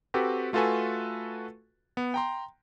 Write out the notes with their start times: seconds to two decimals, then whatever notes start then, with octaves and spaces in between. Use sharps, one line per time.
0.14 C4 F#4 G4 A4 B4
0.53 A3 F4 F#4 A4 B4 G#5
1.97 B3
2.14 G5 A#5 C6